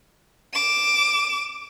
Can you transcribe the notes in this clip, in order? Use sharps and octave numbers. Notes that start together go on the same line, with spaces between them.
D6 E7